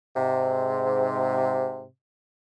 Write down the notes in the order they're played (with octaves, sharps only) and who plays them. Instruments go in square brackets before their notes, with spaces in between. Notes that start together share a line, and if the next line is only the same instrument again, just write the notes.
[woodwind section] G#2 C3